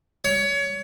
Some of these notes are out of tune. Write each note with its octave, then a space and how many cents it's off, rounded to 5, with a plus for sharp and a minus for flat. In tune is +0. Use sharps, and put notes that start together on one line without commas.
C#5 +25